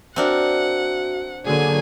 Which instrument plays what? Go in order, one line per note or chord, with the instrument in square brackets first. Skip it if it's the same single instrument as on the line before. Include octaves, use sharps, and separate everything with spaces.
[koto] C4 D4 A#4 [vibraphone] F#4 E5 [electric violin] F#5
[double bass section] D3 F#3 A#3 [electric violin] G#4 G#5